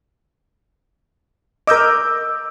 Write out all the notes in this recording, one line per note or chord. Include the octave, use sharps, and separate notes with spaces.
A#4 D#5 D6 E6 G6